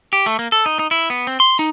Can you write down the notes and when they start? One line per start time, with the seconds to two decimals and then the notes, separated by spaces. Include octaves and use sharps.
0.13 G4
0.26 A3
0.39 A#3
0.52 A4
0.66 D#4
0.79 D#4
0.91 E4
1.10 B3
1.27 C4
1.40 C6
1.59 D#4